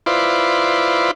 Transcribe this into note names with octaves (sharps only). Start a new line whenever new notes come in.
E4 F4 B4 C5 D5